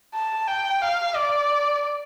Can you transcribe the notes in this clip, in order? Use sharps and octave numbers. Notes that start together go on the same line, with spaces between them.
A5
G5
F5
D5